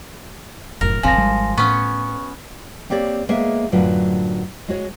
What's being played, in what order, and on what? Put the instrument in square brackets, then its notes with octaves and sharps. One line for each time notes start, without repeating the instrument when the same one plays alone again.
[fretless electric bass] F1 F#2 A2 [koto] A#4
[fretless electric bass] D#1 G#1 C4 [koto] F3 [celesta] G#5 A#6
[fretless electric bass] G#1 G3 G#3
[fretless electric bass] A2 [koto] B3 C#4 [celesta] C#6
[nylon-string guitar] A#3 C4 G4 C#5 D5
G#3 A#3 B3 G#4 C#5 E5
F#2 A2 D3 F#3 F4 B4
G#3 F#4 C#5 D#5